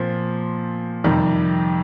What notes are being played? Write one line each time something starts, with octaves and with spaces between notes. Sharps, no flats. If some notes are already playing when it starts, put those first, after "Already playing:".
Already playing: A#2 F3 C4
F2 C3 D#3 G3